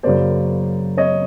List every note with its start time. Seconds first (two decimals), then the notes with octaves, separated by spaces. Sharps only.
0.03 F#2 C#3 F#3 A#3 C5 D5
0.97 C#5 D#5